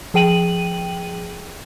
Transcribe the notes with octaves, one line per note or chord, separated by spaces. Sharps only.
F3 G#4 G5 D#7 F#7